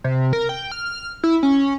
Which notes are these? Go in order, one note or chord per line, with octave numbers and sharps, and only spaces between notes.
C3
A#4
G5
F6
E4
C#4